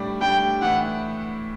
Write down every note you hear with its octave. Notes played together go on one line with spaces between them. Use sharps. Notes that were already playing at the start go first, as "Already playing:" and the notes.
Already playing: A2 G3 D4 G4
A2 G3 D4 G4 G5
A2 E3 B3 E4 F#5